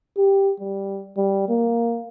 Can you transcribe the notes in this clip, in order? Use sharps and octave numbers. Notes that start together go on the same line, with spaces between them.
G4
G3
G3
A#3